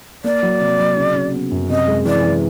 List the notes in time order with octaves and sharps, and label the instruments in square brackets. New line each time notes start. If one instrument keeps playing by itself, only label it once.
[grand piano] A#3 [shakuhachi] D5
[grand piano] F#3
C3
F#3
C#3
C#3
B3
F#2
[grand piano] C3 [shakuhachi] D#5
[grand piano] G#3
[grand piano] E3 [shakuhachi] D5
[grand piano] E3